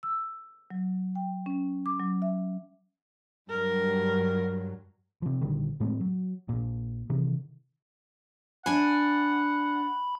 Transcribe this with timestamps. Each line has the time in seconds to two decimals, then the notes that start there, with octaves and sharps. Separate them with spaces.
0.03 E6
0.70 F#3
1.15 G5
1.46 C#4
1.86 D6
2.00 F#3
2.22 E5
3.49 G2 F#3 A#4
5.22 C3 F3
5.41 A#1 D3 D#3 G3
5.80 A2 G#3 A3 C4
6.00 F#3
6.49 A#1 A#2
7.10 C3 D#3 E3
8.66 D4 F#5 G#5 B5